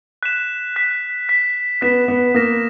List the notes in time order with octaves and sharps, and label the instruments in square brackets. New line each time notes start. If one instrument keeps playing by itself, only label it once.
[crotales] F#6 B6 E7
F#6 B6 E7
F#6 B6 E7
[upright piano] B3 [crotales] F#6 B6 E7
[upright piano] B3
[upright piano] A#3 [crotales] D#6 A#6 E7